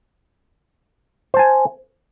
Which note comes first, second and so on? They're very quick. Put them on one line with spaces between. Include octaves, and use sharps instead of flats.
C5 A5 G#5